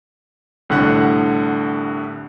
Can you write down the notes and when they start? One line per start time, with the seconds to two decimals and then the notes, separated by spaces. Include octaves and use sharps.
0.69 C2 A2 D3 F#5 F#6